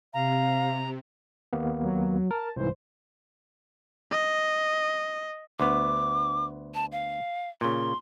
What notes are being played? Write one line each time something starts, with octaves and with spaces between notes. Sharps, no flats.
C3 F5 A#5
D#2 A#3 B3
F#3
A#4 A5
C2 G#2 E3 C5
D#5
D2 B3 D6
A5
F5
A#2 C#3 C6